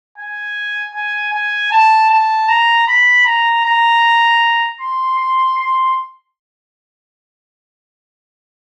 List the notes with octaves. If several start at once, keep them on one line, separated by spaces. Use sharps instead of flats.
G#5
G#5
G#5
A5
A5
A#5
B5
A#5
A#5
C6
C6
C6